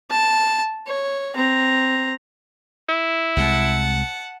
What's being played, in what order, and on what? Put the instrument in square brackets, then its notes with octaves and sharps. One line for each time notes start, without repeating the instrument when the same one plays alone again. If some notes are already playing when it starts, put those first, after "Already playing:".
[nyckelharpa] A5
C#5
C4 A#5
[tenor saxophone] E4
[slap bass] C2 C3 G#3 [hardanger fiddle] F#5 A5